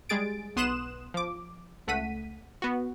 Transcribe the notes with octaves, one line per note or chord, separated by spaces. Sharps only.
G3 G#3 G#4 A6 D7
B1 B3 C6 D#6 F#6 E7
F3 D6
C#2 A3 F#5 B6 D#7
B3 F#4